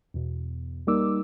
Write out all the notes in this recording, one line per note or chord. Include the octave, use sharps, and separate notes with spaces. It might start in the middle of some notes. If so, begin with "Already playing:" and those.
E2 B2
G3 A#3 D#4 A#4 D6 E6